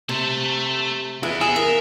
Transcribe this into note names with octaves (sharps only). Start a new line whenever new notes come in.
C3 A3 A4
E3 G#3 B3 E4
G#4 E5
A#4 F5